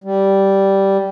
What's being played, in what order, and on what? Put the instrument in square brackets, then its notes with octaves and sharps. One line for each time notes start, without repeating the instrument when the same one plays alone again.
[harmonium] G3